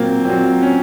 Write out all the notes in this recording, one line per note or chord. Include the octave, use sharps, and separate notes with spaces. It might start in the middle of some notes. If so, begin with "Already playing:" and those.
Already playing: A#2 F#3 A#3 C4
A#2 F#3 C4
C#4